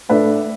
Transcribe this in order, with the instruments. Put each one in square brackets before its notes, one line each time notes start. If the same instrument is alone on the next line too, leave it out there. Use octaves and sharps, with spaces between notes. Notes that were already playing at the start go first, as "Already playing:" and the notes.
[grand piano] A2 A3 D4 B4 E5